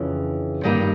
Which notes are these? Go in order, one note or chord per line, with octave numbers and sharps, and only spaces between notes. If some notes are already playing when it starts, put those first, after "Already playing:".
Already playing: F2 C#3 E3 D4
G2 D#3 G3 A#3 D#4